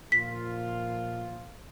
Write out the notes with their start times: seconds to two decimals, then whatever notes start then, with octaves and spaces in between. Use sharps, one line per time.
0.12 A#2 F3 F4 B6